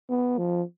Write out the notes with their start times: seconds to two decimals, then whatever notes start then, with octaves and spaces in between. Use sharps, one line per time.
0.09 B3
0.38 F3